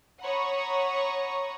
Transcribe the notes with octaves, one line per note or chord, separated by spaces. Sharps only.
C#5 F#5 A#5 B5 C#6 D#6